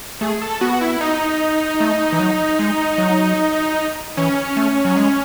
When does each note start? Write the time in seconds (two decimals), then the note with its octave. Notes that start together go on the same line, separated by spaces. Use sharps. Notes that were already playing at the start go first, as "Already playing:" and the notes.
0.21 A3 G#4
0.41 A4
0.61 B3 F#4
0.81 E4
1.01 D#4
1.80 A3
2.12 E3
2.19 F#3
2.59 G#3
2.98 F#3
4.17 E3 C#4
4.57 A3
4.85 F#3
4.96 G#3